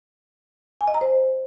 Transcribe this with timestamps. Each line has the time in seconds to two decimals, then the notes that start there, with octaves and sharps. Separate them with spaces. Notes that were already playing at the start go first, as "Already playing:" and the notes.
0.81 G#5
0.88 D#5
0.94 A#5
1.01 C5